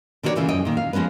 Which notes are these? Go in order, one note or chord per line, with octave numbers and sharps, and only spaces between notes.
D3 D#3 F#4 G4 C#5 D5
A#2 C#3 E3 A3 F4
F#2 D#5 G5
A#2 D#3
F5
F3 G#3 B3 C#4 B4